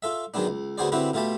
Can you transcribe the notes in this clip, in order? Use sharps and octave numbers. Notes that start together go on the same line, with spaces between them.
F4 A4 E5
D#3 F#3 G#3 B3 D4
C#2
D2 B3 F#4 G#4 C5 D5
D3 C4 E4 F#4 G4 B4
B2 A3 F4 G4 A5 B5